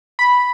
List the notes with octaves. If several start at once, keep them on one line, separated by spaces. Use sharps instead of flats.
B5